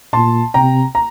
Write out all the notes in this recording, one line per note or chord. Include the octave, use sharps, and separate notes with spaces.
A#2 A5 C6
C3 G5 A#5
A#5